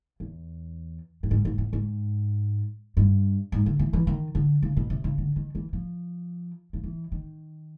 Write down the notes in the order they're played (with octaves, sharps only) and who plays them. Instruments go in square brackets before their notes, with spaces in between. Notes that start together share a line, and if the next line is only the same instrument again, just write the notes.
[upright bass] E2
A2
G#2
G#2
A2
G#2
G2
G#2
D3
E3
E3
D#3
D3
C#3
B2
C3
C#3
D3
D#3
E3
F3
F3
E3
D#3